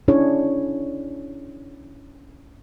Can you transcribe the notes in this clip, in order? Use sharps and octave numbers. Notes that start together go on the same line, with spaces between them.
C#4 D4 E4 G#4 C#5